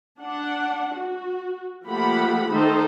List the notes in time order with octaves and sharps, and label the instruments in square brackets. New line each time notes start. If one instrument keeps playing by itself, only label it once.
[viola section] D4 F#5
F#4
F3 A3 A#3 G4 F#5 B5
D#3 A3 D#4 A4 C5